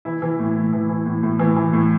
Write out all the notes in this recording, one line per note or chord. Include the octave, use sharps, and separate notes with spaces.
E3 E4
E3
A2
A2
E3
E3
A2
A2
E3
E3
A2